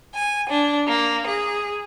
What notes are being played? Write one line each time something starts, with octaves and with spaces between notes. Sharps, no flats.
G#5
D4
A#3
G#4